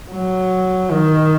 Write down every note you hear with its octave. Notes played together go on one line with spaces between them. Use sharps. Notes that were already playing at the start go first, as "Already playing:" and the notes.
F#3
D#3